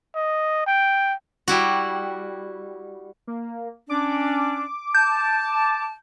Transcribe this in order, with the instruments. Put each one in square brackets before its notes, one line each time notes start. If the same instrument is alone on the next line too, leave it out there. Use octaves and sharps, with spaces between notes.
[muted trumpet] D#5
G5
[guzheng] G3 E4 F#4
[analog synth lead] A#3
[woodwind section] C#4 D4 [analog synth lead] D6
[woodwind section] A5 [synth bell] G6